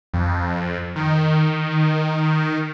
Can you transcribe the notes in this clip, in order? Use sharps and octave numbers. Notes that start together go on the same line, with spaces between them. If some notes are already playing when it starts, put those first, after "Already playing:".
F2
D#3